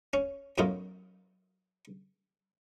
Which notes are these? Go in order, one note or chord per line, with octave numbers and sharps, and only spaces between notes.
C#4
F#2 A2 B3 D#4 F4